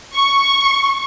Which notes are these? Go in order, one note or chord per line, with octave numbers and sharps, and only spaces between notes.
C#6